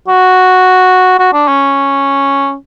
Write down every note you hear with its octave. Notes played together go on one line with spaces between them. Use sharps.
F#4
F#4
D4
C#4